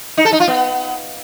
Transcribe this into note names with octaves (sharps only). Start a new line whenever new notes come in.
D#4
A4
D#4
F4
B3